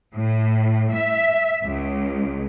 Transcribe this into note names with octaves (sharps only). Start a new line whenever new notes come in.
A2
E5
C#2